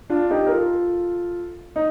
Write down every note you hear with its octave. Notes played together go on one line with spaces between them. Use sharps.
D4 F4
D#4 G4
A#4
F4 A4
D#4